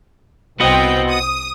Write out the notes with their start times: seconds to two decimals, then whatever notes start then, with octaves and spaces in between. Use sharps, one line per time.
0.60 C2 B3 C4 F#4 D#5 G5
1.09 D#6